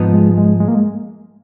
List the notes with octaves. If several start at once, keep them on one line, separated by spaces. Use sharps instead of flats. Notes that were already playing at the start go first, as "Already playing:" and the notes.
Already playing: G#2 F3 B3 D#4
G#3
G#3
G#3
A#3
G#3